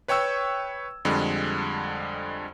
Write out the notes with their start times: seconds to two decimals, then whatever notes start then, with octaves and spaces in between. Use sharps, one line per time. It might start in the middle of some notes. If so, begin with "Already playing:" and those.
0.08 B4 C#5 G5 C#6 E6 G#6
1.05 F2 D3 G3 G#3